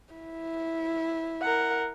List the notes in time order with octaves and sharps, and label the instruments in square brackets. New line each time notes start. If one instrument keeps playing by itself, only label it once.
[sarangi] E4
[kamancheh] A#4 F#5